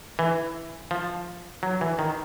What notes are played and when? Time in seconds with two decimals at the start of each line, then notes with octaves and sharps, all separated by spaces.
0.19 E3
0.91 F3
1.63 F#3
1.81 E3
1.99 D#3